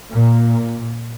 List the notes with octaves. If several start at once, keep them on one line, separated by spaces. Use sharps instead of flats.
A#2